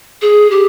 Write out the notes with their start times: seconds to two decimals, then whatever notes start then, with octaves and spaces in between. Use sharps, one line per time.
0.22 G#4
0.51 G4